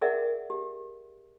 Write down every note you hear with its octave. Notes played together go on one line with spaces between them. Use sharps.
G#4 A#4 D5 E5 F#5
G4